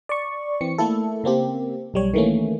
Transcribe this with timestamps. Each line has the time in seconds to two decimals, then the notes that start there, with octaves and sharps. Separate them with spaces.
0.09 D5 C#6
0.61 E3 C4 C#7
0.78 A3 A#3 E4 A4
1.24 C#3 A#3 C4 G4
1.94 B1 G3 C#5
2.14 D#3 E3 A3 A#3 C#4